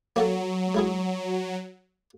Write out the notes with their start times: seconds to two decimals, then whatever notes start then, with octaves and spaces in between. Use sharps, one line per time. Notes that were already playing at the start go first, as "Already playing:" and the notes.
0.16 F#3 A#3 F#4 A4
0.74 G#3 E4 G#4